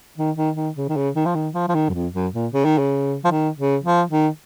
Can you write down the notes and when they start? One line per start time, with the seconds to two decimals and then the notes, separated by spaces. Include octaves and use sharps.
0.17 D#3
0.36 D#3
0.56 D#3
0.77 C#3
0.89 D#3
0.96 C#3
1.15 D#3
1.25 F3
1.35 D#3
1.54 F3
1.68 F3
1.75 D#3
1.89 F#2
1.93 F2
2.14 F#2
2.33 A#2
2.52 C#3
2.65 D#3
2.78 C#3
3.24 F3
3.31 D#3
3.58 C#3
3.84 F3
4.10 D#3